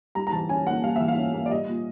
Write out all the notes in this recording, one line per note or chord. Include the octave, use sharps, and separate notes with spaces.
G3 A#5
A#5
E3 A5
C#4 G#5
A#3 F#5
G3 F5
E3 E5
F5
C#4
A#3
D5
G3 D#5
A#2